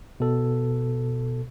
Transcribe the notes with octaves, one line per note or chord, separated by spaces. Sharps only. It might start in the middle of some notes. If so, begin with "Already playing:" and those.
B2 A4